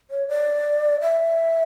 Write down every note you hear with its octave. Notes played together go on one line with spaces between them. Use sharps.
C#5
D5
E5